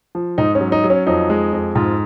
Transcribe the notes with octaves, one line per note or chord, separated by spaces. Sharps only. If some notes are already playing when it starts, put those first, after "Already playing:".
F3
G#2 D#4
C#4
F#3
D#4
F#3
C#4
F2 D#4
G#3
F2
G#2 F4